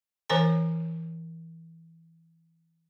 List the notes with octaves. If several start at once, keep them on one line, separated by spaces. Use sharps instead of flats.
E3 A#4 C5 C#5 G#5 A#5